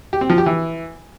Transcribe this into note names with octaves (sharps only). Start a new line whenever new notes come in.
G4
C4
F3
G4
E3